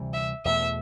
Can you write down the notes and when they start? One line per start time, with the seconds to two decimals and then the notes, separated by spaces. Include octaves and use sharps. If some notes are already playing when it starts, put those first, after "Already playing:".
Already playing: D2 C3 E3 G3
0.14 E5
0.45 E2 B2 A3 E5